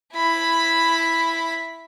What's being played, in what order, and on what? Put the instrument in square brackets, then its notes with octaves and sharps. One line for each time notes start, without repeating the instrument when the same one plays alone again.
[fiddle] E4 B5